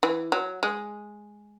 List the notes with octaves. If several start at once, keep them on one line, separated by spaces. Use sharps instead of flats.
E3
F#3
G#3